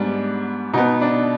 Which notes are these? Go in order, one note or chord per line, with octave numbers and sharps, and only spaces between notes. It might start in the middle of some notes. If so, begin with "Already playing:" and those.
Already playing: G#2 G3 B3 D4
B2 B3 D#4
D4